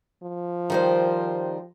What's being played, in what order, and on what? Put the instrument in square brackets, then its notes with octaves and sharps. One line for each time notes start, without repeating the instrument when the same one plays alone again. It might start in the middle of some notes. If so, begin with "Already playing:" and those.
[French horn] F3
[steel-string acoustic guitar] D#3 G3 C5